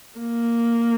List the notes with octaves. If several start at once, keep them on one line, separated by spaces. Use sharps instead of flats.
A#3